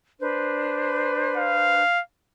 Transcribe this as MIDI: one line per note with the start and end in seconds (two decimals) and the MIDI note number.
0.20 1.82 62
0.20 1.82 71
0.20 1.82 72
1.37 2.01 77